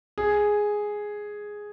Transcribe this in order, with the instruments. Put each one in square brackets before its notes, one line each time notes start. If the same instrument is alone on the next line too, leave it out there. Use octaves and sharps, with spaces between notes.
[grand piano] G#4